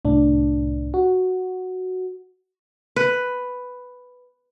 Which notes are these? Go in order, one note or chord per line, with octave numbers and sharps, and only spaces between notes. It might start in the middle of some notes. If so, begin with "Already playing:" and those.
C2 A2 D4
F#4
B4